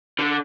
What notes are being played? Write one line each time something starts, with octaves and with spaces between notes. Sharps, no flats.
D3